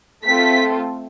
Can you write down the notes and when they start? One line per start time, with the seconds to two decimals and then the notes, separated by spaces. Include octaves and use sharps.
0.24 A3 C4 F4 A4 B6